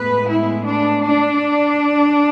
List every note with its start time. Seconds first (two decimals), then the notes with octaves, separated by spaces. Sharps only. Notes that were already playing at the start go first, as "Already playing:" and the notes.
Already playing: A2 G#3 B3 B4
0.26 E4
0.64 D4
1.02 D4